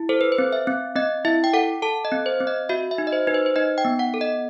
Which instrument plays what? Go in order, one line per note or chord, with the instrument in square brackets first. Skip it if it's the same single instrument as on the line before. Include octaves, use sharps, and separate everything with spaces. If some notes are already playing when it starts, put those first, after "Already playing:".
Already playing: [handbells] E4
A4 C5
B4
C5
C4
E5
C4
C4 D#5
E4 E5
G5
A4 F#5
A4 A5
D#5
C4
C5
C4
D#5
F#4 E5
E5
D#4
D#5
C5
D#4 B4
C5
C5
D#4 D#5
G5
B3
F#5
A4
D#5